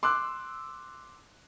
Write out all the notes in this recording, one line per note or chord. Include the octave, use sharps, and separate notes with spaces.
C6 D6 E6 F#6